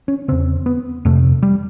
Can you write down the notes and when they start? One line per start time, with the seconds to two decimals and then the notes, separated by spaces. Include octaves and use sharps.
0.08 C#4
0.28 E2 C#3 C4
0.66 B3
1.05 F2 C3 A3
1.43 G3